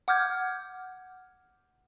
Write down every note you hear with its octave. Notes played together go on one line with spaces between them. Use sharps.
F#5 D6 F6 G6 G#6